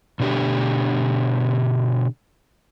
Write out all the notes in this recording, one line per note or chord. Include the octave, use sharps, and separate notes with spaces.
B2 D3 D4 G4